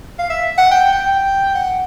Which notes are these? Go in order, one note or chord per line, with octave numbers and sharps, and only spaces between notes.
F5
E5
F#5
G5
G5
F#5